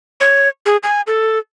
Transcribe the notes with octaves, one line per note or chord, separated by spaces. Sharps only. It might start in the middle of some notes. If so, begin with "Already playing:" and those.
C#5
G#4
G#5
A4